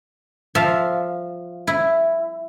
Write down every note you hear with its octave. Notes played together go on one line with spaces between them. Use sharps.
F3 E5 F5
E4